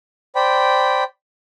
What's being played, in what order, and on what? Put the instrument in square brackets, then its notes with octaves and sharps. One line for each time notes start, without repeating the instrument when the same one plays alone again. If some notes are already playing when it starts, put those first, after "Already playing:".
[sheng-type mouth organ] C5 D5 G5 B5